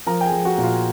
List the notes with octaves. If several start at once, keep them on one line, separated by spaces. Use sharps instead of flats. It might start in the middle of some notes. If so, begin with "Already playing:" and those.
F3 A#4 A#5
G5
G#4 G#5
F3
F#4 F#5
A#2
F4 F5